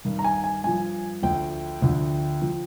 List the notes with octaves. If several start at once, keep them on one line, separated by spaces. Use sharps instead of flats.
G2 D#3
A#5
G#5
G#5
G2 F3 G#5
D2 D3 F3 G5
D2 D3 F3
F3